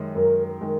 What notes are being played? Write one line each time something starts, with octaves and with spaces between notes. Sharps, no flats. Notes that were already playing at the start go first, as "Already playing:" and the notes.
Already playing: F#2 D#3 G#3
F#2 A#4
A#4
D#3 G#3